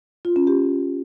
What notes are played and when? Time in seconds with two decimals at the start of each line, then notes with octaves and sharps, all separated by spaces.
0.25 F4
0.36 C#4
0.47 G4